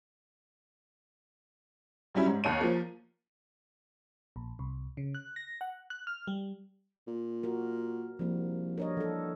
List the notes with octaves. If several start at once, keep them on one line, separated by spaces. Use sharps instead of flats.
G2 F#3 G3 C#4 E4
G#2
D#2 C#5 D#7
F3 A#3
A#1
C2
C#3
F#6
A#6
F#5
F#6
F6
G3
A#2
F#4 A#4
C2 F3 A#3
G2 A#4 C#5 D#5
D3 E3 G3 A4